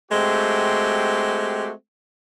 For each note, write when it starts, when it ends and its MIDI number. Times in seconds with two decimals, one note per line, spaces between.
0.11 1.72 56
0.11 1.72 57
0.11 1.72 60
0.11 1.72 66
0.11 1.72 67